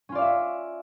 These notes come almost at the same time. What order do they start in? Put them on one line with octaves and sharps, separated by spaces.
C#4 F4 D5 F5 E5